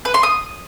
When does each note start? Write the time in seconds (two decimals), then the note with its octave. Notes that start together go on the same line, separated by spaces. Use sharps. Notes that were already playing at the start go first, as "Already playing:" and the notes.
0.05 B4
0.14 C6
0.23 D#6